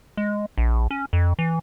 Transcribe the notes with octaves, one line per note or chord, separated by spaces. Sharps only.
G#3
A#1
C#4
F2
E3